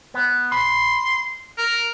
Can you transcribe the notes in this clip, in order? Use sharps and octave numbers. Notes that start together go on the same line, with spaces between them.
B3
B5 C6
A#4